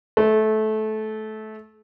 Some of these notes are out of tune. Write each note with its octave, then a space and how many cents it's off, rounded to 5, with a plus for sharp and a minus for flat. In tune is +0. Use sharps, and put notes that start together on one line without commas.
A3 -20